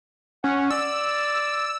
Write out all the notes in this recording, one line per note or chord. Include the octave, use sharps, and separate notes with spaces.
C#4 F#5
D5 E6